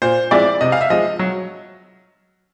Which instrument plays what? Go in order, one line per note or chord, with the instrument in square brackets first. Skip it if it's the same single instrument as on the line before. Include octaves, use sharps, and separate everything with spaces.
[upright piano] A#2 C5
F3 G#3 C4 E4 D5
C3 D#5
F5
E5
F3 G#3 D#5
F#3